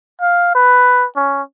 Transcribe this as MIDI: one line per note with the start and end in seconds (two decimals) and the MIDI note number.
0.21 0.53 77
0.55 1.06 71
1.16 1.42 61